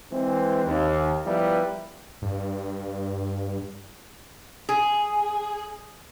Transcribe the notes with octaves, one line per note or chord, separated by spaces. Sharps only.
E3 G#3 C4
D#2
F3 G3 B3 E4 A#4 B4
G2
G#4